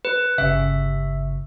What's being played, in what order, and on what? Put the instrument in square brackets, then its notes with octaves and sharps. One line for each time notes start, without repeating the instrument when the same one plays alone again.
[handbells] B4
[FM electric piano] G1 C#3 [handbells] E5